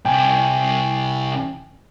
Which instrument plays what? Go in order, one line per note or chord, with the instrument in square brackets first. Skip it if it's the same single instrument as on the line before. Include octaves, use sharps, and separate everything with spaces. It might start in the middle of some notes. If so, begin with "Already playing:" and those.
[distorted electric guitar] C2 [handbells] G5 G#5